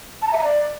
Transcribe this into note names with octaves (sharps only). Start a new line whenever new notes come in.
A5
A#5
E5
A#5
D5